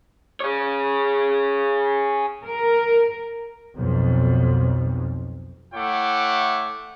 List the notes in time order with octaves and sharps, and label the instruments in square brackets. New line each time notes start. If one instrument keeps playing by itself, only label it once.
[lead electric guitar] G#4 C#5
[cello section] A#4
[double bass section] B1 F2
[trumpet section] A3 E4 C#5 F#5 G5 D6